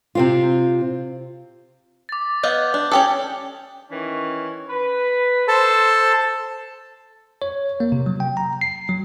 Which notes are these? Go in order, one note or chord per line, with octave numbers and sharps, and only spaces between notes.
C3 C4 F4
D6 A6
B3 D#5 F5 G6
D4
C#4 G4 A4 D#6
D#3 E3 C#4
B4
A4 C5 A5
C#5
A#3
C3
F#3
G5
A#5
C7
F#3